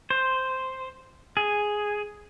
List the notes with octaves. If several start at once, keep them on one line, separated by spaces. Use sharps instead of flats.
C5
G#4